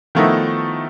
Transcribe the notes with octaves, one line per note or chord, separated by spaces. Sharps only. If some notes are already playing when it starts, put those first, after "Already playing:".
D#3 F3 A3 B3 D#4 E4